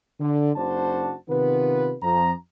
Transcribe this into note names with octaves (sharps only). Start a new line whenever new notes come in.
D3
F#1 C#3 D4 F#4 C5 A5
C3 D#3 B3 F4 B4
F2 F3 A#5